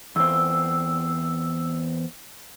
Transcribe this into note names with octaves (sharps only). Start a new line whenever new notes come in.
E2 C4 E6